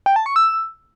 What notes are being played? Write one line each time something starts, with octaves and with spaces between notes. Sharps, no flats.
G5
A5
C#6
E6